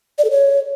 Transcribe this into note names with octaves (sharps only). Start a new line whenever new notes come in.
D5
A4
C#5